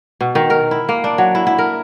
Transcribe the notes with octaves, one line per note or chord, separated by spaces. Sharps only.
B2
D#3
A#4
E4
A#3
D4
F#3
E4
E4
A#4